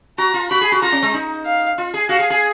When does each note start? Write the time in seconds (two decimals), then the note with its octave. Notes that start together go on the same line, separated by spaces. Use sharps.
0.18 F#4 A#5
0.34 F4
0.50 F#4 B5
0.61 G#4
0.72 F#4
0.82 F4 A#5
0.92 C#4
1.03 G#3
1.14 D#4
1.46 F5
1.78 F4
1.94 G#4
2.09 F#4 F5
2.19 G#4
2.30 G#4